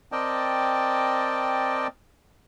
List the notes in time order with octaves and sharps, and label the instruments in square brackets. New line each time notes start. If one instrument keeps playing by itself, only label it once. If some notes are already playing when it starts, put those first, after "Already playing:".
[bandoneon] C4 A#4 D5 D#5 G5 A5